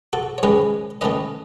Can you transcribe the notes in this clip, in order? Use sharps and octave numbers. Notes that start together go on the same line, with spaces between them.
F#4 A4
C#5
D#3 G#3 C#4 G#4 B4
D#3 A3 C#4 B4 D#5